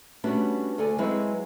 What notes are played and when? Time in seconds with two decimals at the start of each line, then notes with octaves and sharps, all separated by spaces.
0.24 G3 A3 B3 C#4 D4 F#4
0.78 D2 A4 D5 G#5
0.98 F#3 G#3 C4 E4 B4 D#5